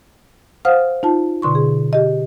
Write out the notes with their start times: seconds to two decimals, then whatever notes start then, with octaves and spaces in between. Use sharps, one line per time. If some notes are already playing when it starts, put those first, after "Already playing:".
0.65 C5 F5 F#5 D#6 F6
1.03 D#4 F4 A5
1.42 B2 D3 C6 C#6
1.55 G#4
1.93 G4 D#5